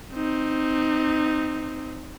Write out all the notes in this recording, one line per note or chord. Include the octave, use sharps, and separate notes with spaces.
C4 D#4